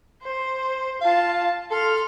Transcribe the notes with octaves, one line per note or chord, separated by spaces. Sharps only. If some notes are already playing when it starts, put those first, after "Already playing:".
C5
F4 F5 A5
A4 C6 F6